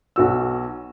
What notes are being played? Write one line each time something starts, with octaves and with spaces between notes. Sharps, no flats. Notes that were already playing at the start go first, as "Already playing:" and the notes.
B1 F#4 E6